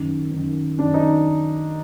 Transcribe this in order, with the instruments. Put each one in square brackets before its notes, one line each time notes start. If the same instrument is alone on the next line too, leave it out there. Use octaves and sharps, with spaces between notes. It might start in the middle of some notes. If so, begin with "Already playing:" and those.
Already playing: [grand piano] F#2 D#3
F#2 D#3
F#2 D#3 D4
D#4